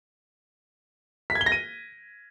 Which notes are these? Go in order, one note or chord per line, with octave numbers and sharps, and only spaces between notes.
B6
G#6
G7
A#6
D#7